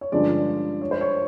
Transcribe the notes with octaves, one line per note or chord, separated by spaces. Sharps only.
C#5
G2 D3 F3 G#3 C#4 D5
C#5
C5
C#5